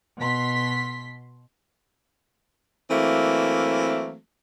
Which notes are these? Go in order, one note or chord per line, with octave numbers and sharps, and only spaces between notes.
B2 C6 B6
E3 F#3 A3 A#3 C4